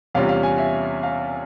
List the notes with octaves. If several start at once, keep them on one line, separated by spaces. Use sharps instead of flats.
E2 C3 G3 C#4 F4 F5
F5
G#5
E5
F5